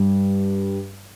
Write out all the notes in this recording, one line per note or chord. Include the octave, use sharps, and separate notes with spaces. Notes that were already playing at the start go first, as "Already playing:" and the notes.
Already playing: G2